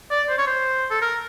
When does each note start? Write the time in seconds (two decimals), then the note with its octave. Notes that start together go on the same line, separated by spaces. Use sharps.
0.11 D5
0.29 C5
0.38 C#5
0.47 C5
0.90 A4
1.02 A#4